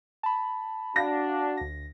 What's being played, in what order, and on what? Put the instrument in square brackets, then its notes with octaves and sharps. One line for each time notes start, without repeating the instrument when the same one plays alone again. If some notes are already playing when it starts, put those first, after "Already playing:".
[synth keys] A5 B5
[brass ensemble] D4 [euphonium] F#4 [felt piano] F5 A#6
[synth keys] D2 A#6